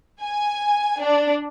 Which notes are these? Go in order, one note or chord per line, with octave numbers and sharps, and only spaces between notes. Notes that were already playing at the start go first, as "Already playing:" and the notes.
G#5
D4